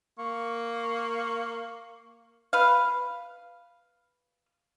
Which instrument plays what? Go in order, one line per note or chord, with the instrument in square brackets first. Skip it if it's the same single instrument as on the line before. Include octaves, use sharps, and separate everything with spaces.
[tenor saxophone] A#3 [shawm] C#6
[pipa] B4 F5